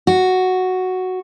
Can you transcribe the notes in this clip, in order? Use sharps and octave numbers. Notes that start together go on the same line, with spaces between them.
F#4